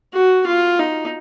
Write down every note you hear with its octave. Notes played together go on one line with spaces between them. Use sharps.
F#4
F4
D#4